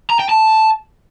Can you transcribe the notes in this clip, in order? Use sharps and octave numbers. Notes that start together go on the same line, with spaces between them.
A#5
G5
A5